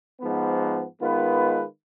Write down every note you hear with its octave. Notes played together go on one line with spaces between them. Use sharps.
G#2 F3 B3
D#3 G#3 B3 F4 B4